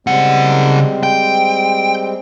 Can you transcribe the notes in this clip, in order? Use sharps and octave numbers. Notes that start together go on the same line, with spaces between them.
C#3 G3 G#3 C4 F#5
G5